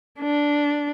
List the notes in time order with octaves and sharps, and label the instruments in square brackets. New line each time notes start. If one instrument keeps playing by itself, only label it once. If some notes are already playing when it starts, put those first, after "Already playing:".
[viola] D4